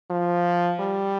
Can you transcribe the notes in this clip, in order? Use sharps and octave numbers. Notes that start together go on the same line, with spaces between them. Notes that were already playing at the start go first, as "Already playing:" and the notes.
F3
G3